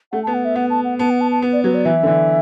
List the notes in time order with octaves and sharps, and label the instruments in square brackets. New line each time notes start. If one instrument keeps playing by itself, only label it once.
[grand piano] A3 [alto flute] F#5
[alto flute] A5
[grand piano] B3
[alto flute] F#5
E5
[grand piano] B3 [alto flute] F#5
[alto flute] A5
F#5
[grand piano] B3 [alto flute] A5
[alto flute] F#5
A5
A5
[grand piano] B3
[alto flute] D5
[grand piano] F#3 [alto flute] B4
[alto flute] D5
[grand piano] E3 [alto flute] E5
[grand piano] D3
E3